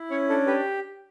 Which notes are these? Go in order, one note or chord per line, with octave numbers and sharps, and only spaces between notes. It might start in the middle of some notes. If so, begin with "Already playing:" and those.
Already playing: E4
C#4 C#5
D4 A4
G4 B4